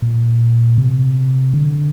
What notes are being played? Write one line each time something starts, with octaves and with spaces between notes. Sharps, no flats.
A#2
C3
D3